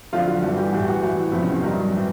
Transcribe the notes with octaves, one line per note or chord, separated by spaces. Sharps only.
F2 D3 F#3 F4
F#4
G2 E3 F#4
G4
A2 E3 F#4
F#4
A2 E3 F#4
E2 C3 F3 E4
C#4
C4
G2 D#3 F#3
A2 E3